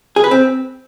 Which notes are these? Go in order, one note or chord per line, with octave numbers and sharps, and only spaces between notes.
G#4
B4
C4